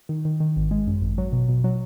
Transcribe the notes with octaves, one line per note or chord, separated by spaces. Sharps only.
D#3
D#3
D#3
G#1
G#3
F#2
G#1
F#3
B2
B2
F#3